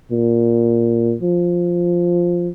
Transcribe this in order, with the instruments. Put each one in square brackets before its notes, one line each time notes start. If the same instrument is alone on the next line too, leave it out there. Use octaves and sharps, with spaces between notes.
[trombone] A#2
F3